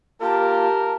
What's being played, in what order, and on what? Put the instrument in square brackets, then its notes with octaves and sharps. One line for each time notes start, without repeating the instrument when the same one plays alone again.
[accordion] A#3 F4 [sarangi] G4 [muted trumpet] A#4 [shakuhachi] A5